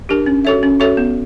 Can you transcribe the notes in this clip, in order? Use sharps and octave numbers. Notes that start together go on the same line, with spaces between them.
D4 G4 A#4
C#4
F#4 A4 C#5 E5
C#4
F#4 A4 C#5 E5
B3